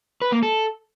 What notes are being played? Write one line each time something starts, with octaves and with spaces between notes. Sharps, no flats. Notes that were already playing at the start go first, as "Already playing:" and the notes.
B4
A#3
A4